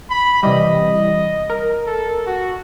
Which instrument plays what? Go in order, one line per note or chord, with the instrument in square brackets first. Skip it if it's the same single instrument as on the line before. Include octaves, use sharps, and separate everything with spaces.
[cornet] B5
[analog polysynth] C3 E3 G3 [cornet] D#5
[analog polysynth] A#4
[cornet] A4
F#4